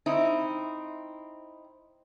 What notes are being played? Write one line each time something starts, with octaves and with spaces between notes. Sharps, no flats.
C4 D#4 E4